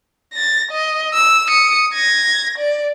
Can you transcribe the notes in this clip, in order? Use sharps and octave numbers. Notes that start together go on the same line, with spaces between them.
A6 A#6
D#5
E6
D#6 C#7
G#6 A#6
D5